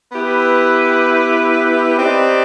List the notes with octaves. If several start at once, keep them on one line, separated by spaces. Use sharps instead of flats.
B3 E4 G4 B4
C4 D#4 G4 B4 D5